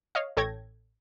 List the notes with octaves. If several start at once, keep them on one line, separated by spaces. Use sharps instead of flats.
C#5 D#5 F5
A1 A4 C#5 G5 G#6 A#6